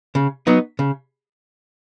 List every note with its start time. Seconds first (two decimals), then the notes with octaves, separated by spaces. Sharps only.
0.15 C#3
0.47 F#3 B3 D#4
0.79 C#3